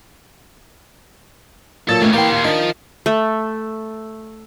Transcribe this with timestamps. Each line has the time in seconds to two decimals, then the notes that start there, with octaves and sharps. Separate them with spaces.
1.89 A#2 F#3 A4
2.02 D#3 A3 B3 C#4 D4
2.13 E3 G3 A#3 G5 C6
2.32 D#2 A#2 F4
2.45 D#3 F3 D4
3.06 A3